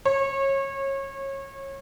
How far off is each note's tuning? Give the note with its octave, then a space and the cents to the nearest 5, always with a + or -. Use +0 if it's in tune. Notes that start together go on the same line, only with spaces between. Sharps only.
C#5 -30